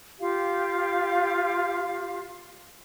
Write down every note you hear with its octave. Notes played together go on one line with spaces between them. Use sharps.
F4 G4 F5